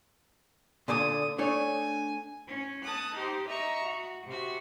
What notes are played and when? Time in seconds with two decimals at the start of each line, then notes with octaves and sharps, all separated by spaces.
0.88 A#2 D3 G#5 D#6
1.38 A3 D4 C#5 G#5
2.47 C#4
2.82 A5 D#6 F#6
3.14 D#4 G4 C5
3.46 D#5 E5 A#5 C#6
3.83 F#4
4.25 C3 F#4